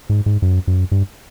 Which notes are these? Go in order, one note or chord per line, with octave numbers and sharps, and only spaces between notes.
G#2
G#2
F#2
F#2
G2